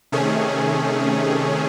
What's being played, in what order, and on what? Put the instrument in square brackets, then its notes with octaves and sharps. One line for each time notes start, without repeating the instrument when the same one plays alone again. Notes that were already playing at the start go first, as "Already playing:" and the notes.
[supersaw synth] C3 D#3 A3 C#4 G#4